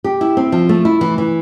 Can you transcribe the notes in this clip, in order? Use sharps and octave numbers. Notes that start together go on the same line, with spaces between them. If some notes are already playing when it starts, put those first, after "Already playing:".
G4
E4
C4
F3
A3
E4
E3
E3